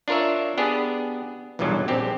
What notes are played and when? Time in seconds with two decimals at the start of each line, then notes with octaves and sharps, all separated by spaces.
0.08 D4 F4 A#4 C#5 E5
0.58 B3 D4 G4 G#4
1.59 B1 E2 G2 A#2 F#3
1.88 A#1 C4 G4